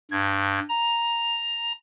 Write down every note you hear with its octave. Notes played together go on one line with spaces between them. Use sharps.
G2 G#6
A#5